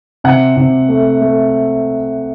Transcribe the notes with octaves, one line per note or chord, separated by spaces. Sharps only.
C3 F#5
C3
A3
A3